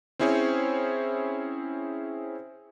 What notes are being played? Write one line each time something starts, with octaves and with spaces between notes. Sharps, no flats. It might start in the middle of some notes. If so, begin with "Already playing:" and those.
C4 C#4 E4 G#4 C5 C#5